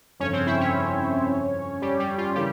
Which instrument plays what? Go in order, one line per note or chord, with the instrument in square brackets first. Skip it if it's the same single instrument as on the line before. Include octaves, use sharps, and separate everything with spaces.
[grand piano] G1 F2 C#3 [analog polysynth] C#4 C#5
[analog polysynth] C4 C5
E4 E5
C#4 C#5
G3 G4
G3 G4
F4
[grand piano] C#3 E3 A#3 [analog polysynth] G3 G4